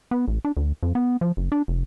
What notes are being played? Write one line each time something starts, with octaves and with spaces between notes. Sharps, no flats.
B3
A1
D4
D2
F2
B3
F3
F#1
D4
F1